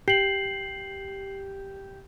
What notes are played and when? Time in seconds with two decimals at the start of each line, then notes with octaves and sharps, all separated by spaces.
0.08 G4 C7 F#7